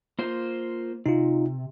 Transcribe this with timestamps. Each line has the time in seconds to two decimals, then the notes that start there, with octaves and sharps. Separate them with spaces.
0.19 A#3 F4 C5
1.06 C3 D#4 F4